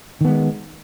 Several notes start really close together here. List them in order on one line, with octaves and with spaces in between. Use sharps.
D#3 B3 G#3